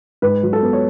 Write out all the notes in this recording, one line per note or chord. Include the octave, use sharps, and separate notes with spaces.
G#2 B4
F#3
A4
B3
C#5